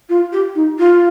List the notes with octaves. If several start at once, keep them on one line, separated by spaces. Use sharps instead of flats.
F4
G4
D#4
F4